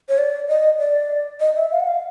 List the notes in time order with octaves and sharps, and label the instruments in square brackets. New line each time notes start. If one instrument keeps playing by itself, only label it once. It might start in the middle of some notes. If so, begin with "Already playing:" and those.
[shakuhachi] C#5
D5
D#5
D5
D#5
E5
F5
F#5
F5